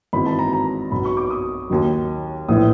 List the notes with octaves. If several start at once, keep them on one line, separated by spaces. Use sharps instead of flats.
G#1 G#2 E3 B5
A5
A#5
A#5
B1 B2 F#3 B5
C#6
D6
D#6
D#2 D#3 F#3
A#1 A2 E3 D#6